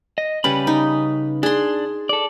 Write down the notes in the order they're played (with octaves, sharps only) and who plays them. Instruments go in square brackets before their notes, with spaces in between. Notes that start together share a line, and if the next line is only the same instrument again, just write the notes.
[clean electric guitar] D#5
[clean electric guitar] C#3 B4 B5 [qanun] G3 C#4
[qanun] D#4
[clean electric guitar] D4 [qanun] G#4 C6
[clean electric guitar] A4 D5